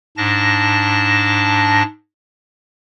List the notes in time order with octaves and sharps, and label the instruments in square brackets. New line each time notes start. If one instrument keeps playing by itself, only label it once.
[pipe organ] G#2 D4 A5 A#6